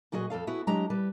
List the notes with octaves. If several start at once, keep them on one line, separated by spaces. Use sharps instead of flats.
A#2 F#3 F#4 G#4 D#5
F2 E3 A4 F5
B3 E4 F#4 G#4
F#3 G#3 D4 G4 A#5
G3 B4